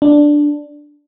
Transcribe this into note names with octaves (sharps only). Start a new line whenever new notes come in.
D4